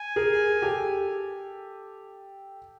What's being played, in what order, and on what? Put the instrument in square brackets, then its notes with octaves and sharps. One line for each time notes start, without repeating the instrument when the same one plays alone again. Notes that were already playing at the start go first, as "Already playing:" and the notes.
Already playing: [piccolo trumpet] G#5
[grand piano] G#4 A#4
G4 A4